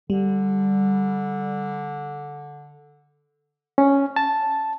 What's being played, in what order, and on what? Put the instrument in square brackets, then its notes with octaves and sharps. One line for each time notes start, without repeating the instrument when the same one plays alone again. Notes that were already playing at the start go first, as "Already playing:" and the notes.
[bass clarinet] D3 [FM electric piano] G3
[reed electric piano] C#4
A5